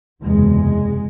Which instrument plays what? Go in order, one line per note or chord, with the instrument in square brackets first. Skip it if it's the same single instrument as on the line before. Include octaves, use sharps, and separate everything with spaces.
[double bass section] F#1 E2 C3 G#3